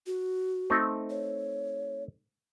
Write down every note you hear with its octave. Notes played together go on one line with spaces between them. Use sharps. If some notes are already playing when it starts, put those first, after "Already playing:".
F#4
A3 C4 D#4
C#5